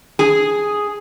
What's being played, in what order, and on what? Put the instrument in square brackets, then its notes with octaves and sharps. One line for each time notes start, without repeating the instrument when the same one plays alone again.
[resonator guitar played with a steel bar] G#4